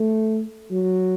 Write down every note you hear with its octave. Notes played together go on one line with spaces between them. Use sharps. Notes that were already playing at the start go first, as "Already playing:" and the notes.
Already playing: A3
F#3